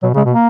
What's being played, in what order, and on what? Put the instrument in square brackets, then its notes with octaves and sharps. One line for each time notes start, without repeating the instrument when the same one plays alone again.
[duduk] B2 [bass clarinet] F#3
[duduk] C#3
[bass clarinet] G#3
[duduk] B2
[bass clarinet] A#3